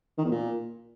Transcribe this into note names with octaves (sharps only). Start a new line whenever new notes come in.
D#3
E2
A#2